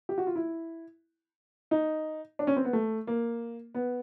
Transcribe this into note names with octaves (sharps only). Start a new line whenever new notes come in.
G4
F#4
F4
E4
D#4
D4
C#4
C4
B3
A3
A#3
B3